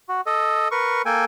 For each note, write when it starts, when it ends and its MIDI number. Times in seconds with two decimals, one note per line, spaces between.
0.09 0.21 66
0.26 0.68 69
0.26 0.68 75
0.71 1.02 70
0.71 1.02 71
0.71 1.02 85
1.06 1.25 58
1.06 1.25 69
1.06 1.25 79
1.06 1.25 80